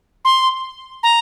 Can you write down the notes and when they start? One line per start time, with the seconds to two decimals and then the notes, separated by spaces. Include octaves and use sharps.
0.25 C6
1.03 A#5